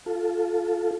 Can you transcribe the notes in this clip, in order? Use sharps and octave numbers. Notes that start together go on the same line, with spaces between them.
F4 A4